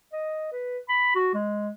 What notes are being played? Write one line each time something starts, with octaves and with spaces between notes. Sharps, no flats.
D#5
B4
B5
F#4
G#3